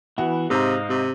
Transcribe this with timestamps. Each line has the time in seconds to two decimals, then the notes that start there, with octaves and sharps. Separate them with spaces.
0.18 E3 B3 E4 F#4 F#5
0.50 G#2 C3 C5 D#5 F5 A#5
0.89 C3